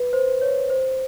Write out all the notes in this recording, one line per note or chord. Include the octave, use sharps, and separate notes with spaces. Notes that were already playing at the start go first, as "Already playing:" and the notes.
Already playing: B4
C5
C#5
C5